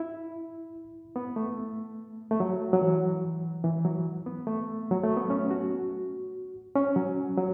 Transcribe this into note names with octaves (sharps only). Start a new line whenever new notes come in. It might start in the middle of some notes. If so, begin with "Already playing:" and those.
Already playing: E4
B3
A3
A3
F#3
F#3
E3
E3
F#3
B3
A3
F#3
A3
B3
C#4
F#4
C#4
F#3
F#3